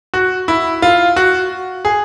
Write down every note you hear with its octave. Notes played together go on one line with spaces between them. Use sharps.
F#4
E4
F4
F#4
G#4